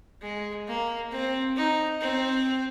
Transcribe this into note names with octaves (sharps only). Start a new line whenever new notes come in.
G#3
A#3
C4
D#4
C4